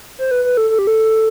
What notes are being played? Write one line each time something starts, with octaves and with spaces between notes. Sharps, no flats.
C5
B4
B4
A4
A4
G4
A4